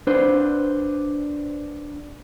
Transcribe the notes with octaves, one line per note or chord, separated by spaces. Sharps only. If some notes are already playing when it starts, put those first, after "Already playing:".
D4 B4 C5